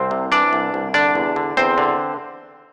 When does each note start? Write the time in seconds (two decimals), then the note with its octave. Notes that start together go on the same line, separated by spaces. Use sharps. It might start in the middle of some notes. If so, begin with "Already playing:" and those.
Already playing: C2 C4 C5
0.11 C3
0.31 E3 D4 D5
0.53 C2
0.74 C2
0.94 D3 D4 D5
1.15 E2
1.36 D3
1.57 E2 C4 C5
1.78 D3